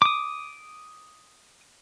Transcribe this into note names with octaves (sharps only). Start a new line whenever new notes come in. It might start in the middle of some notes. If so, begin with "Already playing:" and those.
D6 D#6